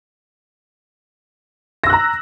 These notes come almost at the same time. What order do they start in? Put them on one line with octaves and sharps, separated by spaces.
A#6 E6 F#6 A#5